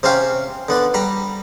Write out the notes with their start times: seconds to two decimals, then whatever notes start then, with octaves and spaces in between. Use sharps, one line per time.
0.03 C3 C4 C#4 G4 F5
0.68 D3 B3 D5
0.94 G3 A#5 B5